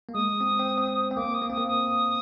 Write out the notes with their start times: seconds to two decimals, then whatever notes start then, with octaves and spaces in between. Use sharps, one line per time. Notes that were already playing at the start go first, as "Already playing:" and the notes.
0.09 A#3
0.14 G#3 D#6
0.40 C4
0.59 C4
0.78 C4
1.11 C4
1.16 A#3 D6
1.34 D#6
1.42 A#3
1.50 C4 D#6
1.58 A#3
1.68 D#6